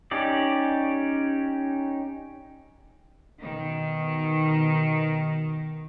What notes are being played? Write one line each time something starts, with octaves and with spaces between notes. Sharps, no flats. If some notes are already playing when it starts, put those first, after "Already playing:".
C#4 D#4 G4 D5
B2 D#3